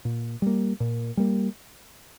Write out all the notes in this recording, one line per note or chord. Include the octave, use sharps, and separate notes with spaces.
A#2
G3 A#3
A#2
G3 A#3